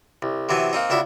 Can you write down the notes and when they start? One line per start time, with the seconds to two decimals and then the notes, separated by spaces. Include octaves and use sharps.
0.22 C2
0.49 C3 E3 F#3 B3
0.73 A#3 C4 D#4
0.90 C#2 D4 E4 F#4 B5